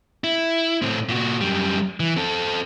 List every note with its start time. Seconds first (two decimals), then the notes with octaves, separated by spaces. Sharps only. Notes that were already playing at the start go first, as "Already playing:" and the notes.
0.24 E4
0.82 A2 C4
1.09 A#2 F#4
1.41 F#2 G3
2.00 E3
2.17 C4 A4